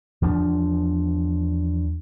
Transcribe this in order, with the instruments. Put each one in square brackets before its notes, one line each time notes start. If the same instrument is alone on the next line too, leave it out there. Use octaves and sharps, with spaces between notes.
[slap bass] E2 F3 A3 D4